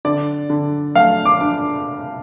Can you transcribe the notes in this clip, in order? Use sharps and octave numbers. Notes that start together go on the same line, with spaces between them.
D3 D5
D3
A3 F5
D6
D4